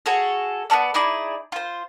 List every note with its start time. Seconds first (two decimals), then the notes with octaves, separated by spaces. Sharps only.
0.06 F#4 G#4 A4 C#5
0.70 B3 E4 A4 D5
0.94 D#4 E4 G#4 D5
1.52 F4 C5